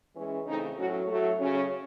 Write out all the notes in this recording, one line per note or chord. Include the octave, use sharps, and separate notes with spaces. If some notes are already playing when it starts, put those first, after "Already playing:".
E3 G#3 C#4
C#3 E3 A3 C4 D#4
A2 F#3 C#4 F#4
A2 F#3 A3
C#3 F#3 C#4